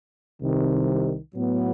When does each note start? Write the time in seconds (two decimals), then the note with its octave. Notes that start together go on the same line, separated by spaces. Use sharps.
0.42 C2 C3 D#3
1.35 A2 F#3 B3